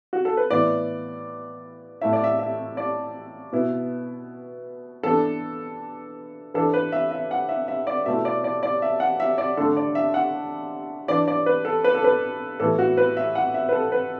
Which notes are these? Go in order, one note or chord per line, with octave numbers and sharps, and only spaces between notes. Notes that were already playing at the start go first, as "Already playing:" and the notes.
F#4
A4
B4
A2 E3 B3 E4 D5
A2 A3 E4 E5
D5
E5
E5
D5
B2 B3 E4
E3 B3 D4 A4
E3 D4 A4
B4
E5
E5
F#5
E5
E5
D5
B2 A3 E4 E5
D5
D5
D5
E5
F#5
E5
D5
D3 A3 D4 A4
D5
E5
F#5
E3 D4 D5
D5
B4
A4
B4
A4
B4
A2 E3 B3 E4 A4
F#4
B4
E5
F#5
E5
B4
A4
B4